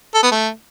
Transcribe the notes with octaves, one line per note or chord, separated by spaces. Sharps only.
A4
B3
A3